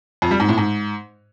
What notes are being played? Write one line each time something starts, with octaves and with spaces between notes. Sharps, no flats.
F2
G3
G#2
A2
G#2